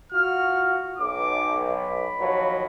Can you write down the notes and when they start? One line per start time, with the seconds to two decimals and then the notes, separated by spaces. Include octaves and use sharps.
0.12 F4 F#4 F6
0.98 B1 D6
1.77 B5
2.20 D#2 F3 F#3